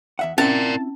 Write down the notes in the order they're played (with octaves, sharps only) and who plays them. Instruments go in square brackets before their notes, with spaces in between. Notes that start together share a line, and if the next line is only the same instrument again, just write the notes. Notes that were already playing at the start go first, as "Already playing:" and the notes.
[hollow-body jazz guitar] E2 E5 F#5
[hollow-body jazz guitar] C4 E4 [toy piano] C#4 [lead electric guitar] A#4 D5 [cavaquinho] A5